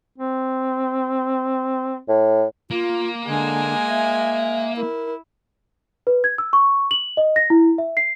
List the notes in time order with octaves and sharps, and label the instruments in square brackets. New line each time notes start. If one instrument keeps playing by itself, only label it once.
[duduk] C4
[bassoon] A2
[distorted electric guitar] A#3 [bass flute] F4
[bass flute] D3 [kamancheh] G#3 G#5
[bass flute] E5
[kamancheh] E4 [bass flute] A#4
[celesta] B4
G#6
E6
C#6
F#7
D#5
A#6
E4
E5
C7